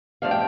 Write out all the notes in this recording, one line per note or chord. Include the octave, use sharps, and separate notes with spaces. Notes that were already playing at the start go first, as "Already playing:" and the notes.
G2 F3 A3 D4 F5
G5